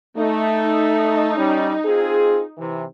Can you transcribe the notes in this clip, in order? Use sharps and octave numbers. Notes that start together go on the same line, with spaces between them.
A3 D#4
G3 C#4
C4 F4 G#4
C3 E3